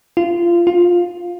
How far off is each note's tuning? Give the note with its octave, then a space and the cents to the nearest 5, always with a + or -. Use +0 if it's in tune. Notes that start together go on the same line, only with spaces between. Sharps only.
F4 -25
F4 +10